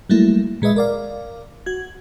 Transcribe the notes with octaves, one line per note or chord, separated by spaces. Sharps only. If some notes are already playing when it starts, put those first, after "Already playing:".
F#3 G3 A3 A#3 E4
A#2 G#3 B4 D#5 E5
A#4 D5 F5
F#4 G#6